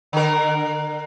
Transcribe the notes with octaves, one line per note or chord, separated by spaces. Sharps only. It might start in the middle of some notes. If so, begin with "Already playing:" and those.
D3 A#4